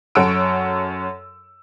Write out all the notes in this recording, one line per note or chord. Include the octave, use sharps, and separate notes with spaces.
F#2 A4 C#5 F#5 E6 D7